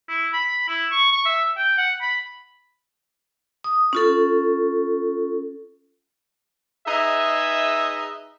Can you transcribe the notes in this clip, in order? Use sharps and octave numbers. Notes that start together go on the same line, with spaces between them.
E4
B5
E4
C#6
C#6
E5
G5
F#5
B5
D#6
C#4 F4 A4
D#4 G#4 B4 D#5 E5